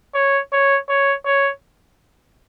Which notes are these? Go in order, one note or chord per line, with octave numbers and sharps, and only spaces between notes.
C#5
C#5
C#5
C#5